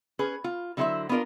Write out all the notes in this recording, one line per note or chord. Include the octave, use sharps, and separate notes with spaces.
C#4 G#4 B4
F4
D3 F#3 E4 G#4 C5 E5
B3 D4 F4 A#4 D5